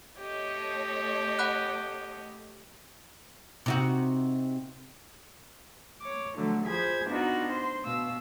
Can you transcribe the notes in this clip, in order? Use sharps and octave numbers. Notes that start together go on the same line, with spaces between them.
A3 G4 C#5 D#5
F#5 B5 F#6
C3 D#4 F#4
C#5 D6
D3 F3 F#3 A3
F3 G#4 C5 B5 G#6
B3 D4 D#4 F4 F#4
C5 C6
B2 F5 E6